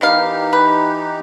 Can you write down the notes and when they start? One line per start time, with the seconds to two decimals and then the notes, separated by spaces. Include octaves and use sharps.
0.01 D#3 E3 B3 D#4 G4 F5
0.53 B4